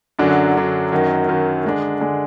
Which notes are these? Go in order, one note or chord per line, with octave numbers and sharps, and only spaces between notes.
F#2 D3 F#3 D4
F#2 D3 F#3 D4
F#2 D#3 F#3
F#2 D#3 F#3
D3 G#3 D4
D3 G#3 D4